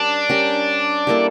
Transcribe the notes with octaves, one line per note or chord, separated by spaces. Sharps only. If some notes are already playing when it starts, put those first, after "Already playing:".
Already playing: G3 C#4 D4 G4 A#4
G3 C#4 G4 A#4
G3 A#3 E4 A4